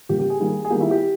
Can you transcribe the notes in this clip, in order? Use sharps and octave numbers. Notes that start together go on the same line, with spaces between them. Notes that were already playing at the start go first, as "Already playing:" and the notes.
C#3 G3 A#3 G4
G4
G#4
D#3 G3 A#3
G#4
D#3 G3 A#3 G4
E4
G4